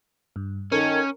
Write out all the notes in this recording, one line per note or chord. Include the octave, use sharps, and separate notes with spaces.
G2
D#3 C#4 A4 A#4 G#6